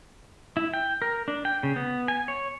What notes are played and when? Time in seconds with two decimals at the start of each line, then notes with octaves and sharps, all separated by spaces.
0.57 E4
0.74 G5
1.02 A#4
1.28 D4
1.45 G5
1.63 C#3
1.76 B3
2.08 G#5
2.28 C#5